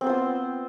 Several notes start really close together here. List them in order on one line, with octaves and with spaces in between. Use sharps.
C4 B3 C5 F4